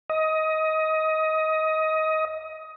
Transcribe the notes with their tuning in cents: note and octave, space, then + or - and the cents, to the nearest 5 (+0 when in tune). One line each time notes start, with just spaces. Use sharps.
D#5 +20